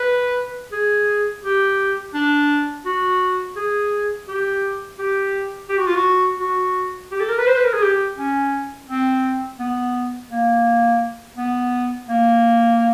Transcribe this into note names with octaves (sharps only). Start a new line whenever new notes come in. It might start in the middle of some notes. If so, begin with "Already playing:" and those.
Already playing: B4
G#4
G4
D4
F#4
G#4
G4
G4
G4
F#4
F4
F#4
F#4
G4
A4
A#4
B4
C5
B4
A#4
G#4
G4
C#4
C4
B3
A#3
B3
A#3